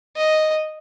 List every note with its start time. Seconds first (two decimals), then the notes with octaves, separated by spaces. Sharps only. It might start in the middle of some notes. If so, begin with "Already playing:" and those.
0.16 D#5